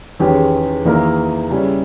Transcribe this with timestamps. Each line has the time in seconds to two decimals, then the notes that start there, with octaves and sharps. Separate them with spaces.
0.19 E2 D#3 G#3 C#4 G4
0.85 E2 D#3 A#3 E4 A#4
1.50 C#3 G3 C#4 E4